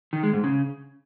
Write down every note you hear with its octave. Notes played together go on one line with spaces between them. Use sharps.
D#3
G#3
G#2
C#3